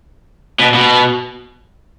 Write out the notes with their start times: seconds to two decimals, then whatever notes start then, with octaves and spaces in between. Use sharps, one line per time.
0.60 B2
0.74 B2